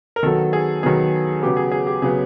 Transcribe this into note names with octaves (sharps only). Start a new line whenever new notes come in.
A#4
D#3 F#3 B3 A4
G#4
D#3 F#3 B3 G#4
C#3 F#3 B3 G4
G#4
G#4
G4
C#3 F#3 B3 G#4